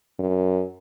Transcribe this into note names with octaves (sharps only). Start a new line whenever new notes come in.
F#2